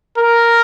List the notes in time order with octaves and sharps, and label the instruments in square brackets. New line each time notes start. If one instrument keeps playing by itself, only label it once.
[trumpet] A#4